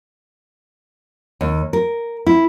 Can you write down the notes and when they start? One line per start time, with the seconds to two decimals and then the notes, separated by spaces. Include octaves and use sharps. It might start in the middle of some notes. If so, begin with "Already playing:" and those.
1.41 D#2
1.73 A#4
2.27 E4